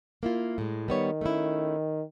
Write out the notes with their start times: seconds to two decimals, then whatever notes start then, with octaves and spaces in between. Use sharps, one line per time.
0.23 A#3 E4 F4
0.58 A2 G#3
0.88 D#3 G3 B3 C#5
1.21 A3 C#4 E4